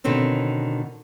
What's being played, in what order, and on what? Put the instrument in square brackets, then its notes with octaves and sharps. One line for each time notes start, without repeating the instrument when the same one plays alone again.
[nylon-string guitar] B2 D3 D#3 C4 C#4